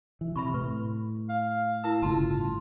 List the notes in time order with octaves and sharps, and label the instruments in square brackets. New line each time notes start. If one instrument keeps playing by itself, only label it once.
[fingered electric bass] E3
[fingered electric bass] C3 [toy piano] E5 B5 C#6
[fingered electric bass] A2 [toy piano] B4 C#6
[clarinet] F5
[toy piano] E4 A#4 E6 [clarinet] A5
[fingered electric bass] G1 A2 C#3 [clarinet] F4 [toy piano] A5